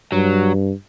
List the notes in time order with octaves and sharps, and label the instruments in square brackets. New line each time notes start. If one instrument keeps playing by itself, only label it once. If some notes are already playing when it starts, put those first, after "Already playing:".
[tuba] G2 [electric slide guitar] F#3